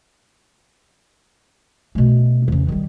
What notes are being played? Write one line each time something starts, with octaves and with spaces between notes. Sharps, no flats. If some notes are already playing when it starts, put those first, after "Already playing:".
B2 A3
E2 C#3
D#3 G3